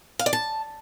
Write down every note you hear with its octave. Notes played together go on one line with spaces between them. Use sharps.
F5
D5
A5